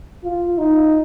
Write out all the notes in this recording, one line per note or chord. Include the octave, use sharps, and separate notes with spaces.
F4
D#4